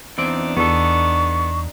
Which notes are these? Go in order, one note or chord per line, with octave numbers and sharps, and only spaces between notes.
E2 C4 D4 D#4 D5
E2 B3 A4 C#6